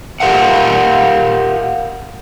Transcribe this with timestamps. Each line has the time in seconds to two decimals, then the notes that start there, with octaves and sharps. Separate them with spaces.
0.20 G4 A#4 F5 F#5